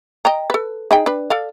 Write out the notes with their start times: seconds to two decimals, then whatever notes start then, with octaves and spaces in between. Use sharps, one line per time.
0.25 D#5 G5 A#5
0.50 A4 B4
0.91 D#4 G#4 G5
1.06 D4 B4
1.30 A4 D5 F5